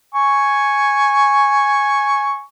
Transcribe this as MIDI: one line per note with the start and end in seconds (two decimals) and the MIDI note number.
0.15 2.42 80
0.15 2.42 85